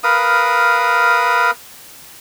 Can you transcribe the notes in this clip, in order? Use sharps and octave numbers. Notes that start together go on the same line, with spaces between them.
A#4 B4 F5 D#6